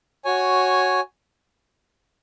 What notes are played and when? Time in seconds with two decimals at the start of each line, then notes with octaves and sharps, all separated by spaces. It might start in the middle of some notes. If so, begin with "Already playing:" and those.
0.25 F#4 C#5 G#5